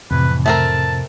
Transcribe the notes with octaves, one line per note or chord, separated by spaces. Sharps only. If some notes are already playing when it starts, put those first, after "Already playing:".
F2 A2 C3 E3 B4
A3 C4 A#4 A5